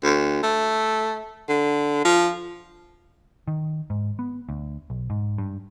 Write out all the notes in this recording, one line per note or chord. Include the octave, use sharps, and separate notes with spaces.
D2
A3
D3
F3
D#3
G#2
B3
D2
B1
G#2
G2